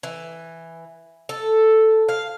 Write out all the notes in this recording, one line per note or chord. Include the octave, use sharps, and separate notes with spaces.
E3
A4
F5